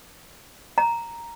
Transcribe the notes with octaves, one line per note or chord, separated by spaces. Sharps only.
A#5